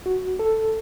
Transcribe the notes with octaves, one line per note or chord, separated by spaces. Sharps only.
F#4
A4